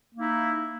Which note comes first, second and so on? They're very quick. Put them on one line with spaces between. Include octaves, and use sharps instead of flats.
A#3 D#4 E4